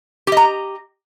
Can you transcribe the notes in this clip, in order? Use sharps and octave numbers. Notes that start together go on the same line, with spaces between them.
G4 D#5 A#5